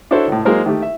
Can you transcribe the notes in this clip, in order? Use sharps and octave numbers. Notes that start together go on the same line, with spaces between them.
D4 E4 F#4 A4 C5 C#5
C#2 A2
F#3 G#3 A#3 A#4 C5
D#3 A3 G4
E5